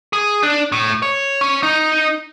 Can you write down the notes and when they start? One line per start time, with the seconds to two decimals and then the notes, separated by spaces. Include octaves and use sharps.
0.13 G#4
0.43 D4
0.72 A2
1.02 C#5
1.41 C#4
1.63 D#4